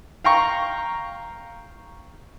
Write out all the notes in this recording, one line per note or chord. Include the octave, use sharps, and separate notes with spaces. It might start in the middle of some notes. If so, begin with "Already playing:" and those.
F5 G5 A#5 C#6